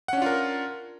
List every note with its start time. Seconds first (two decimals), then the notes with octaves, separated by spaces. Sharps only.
0.08 F#5
0.13 C#4
0.17 D4
0.22 F4
0.26 A#4